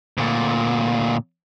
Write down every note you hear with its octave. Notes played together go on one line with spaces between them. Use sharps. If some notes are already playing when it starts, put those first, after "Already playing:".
D2 A#2